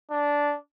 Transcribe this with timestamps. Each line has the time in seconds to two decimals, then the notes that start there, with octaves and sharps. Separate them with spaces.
0.11 D4